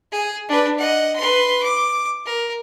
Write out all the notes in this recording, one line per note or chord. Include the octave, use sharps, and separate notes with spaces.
G#4
D4 B4
D#5 F#5
B4 C6
D6
A#4